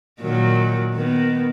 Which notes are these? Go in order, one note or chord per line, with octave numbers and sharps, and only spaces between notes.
A#2 D#3 F#3
D#3 B3